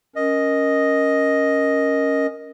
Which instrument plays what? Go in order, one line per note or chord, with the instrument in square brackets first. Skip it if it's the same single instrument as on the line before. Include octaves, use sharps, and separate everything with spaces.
[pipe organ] C#4 A#4 [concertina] D#5